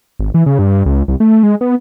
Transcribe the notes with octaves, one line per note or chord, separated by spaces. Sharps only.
G#1
E3
C#3
G2
C#2
C2
A3
G#3
B3